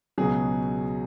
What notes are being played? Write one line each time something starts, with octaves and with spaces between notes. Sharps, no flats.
C#2 B2 F#3 G#4